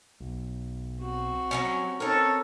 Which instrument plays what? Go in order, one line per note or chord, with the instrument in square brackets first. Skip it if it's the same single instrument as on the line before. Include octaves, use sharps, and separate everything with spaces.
[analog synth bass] B1
[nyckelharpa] C4 F#4
[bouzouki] F#3 B3 C#4
[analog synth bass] C4 [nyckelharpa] C#4 D#4 [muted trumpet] A4 [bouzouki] A#4 C#5